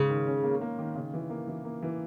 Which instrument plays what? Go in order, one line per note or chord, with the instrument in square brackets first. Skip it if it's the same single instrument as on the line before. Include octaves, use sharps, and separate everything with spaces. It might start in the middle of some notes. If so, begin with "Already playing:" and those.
Already playing: [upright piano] G#2 [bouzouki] C#3
[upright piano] D#3
C#4
A#3
A#3
D#3
C#3
E3
A#3
E3
A#3
E3